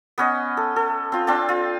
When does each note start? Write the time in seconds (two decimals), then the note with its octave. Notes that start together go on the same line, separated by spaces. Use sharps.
0.18 B3 C#4 D#5
0.57 A4
0.76 A4
1.12 C4 F4
1.27 C4 D4 G5 A5
1.49 F4